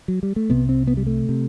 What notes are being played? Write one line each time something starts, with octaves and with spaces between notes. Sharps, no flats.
F#3
G3
A3
C2 C3 B3
C4
B3
G3
A3
C3